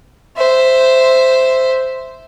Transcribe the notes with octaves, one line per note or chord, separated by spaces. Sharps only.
C5 E5